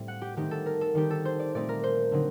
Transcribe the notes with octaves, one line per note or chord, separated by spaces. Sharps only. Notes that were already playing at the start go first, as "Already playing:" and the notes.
Already playing: A2 G3 C4
F#5
G4
D#3 A3 C4 D#4 G4
A4
A#4
A4
D#3 G3 C4 D#4 G4
A4
C5
D5
A#2 A3 C4 D#4 D5
A#4
C5
D3 F#3 C4 D#4